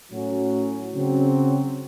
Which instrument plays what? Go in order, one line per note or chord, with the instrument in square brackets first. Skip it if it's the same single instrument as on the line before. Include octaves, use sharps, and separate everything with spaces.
[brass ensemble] A2 F#3 C#4 F#4
C#3 F#3 C4